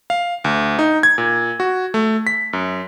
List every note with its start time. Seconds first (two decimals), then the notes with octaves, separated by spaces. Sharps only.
0.10 F5
0.44 D2
0.79 D#4
1.03 G#6
1.18 A#2
1.60 F#4
1.94 A3
2.27 B6
2.53 F#2